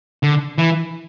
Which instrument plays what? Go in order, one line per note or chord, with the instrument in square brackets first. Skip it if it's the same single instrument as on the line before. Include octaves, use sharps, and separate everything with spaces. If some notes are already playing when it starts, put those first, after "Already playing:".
[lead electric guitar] D3
E3